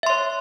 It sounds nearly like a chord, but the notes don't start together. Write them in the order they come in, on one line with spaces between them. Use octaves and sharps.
E5 C6 C#5